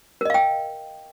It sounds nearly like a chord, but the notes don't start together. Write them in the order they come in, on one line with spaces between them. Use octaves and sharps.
A#4 D#5 F5 G5